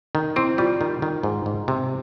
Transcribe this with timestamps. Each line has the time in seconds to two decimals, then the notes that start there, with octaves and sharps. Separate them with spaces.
0.15 D#3
0.36 C4 E4
0.58 G3 F4
0.81 D#3
1.02 D#3
1.23 G#2
1.46 G#2
1.68 C3